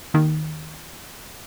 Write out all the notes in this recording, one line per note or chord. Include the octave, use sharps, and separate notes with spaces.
D#2 D#3